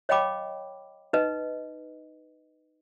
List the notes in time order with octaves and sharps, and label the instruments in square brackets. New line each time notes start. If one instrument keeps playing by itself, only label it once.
[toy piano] C#5 D#5 F5 G5 B5 D6
D#4 B4 D#5